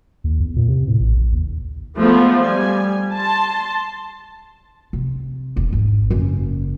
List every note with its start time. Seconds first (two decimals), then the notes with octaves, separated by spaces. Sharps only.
0.24 D#2
0.40 E2
0.56 A#2
0.69 C3
0.88 A2
1.00 A1
1.18 A1
1.32 D#2
1.98 F3 G#3 A3 B3
2.41 G3 G#5
3.13 A5 C6
4.93 C3
5.56 E1 E2
5.73 G#1
6.10 F#1 C#4